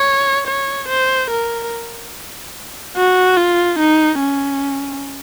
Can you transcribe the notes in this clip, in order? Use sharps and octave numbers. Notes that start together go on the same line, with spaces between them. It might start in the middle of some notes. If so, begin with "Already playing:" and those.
Already playing: C#5
C#5
C5
A#4
F#4
F4
D#4
C#4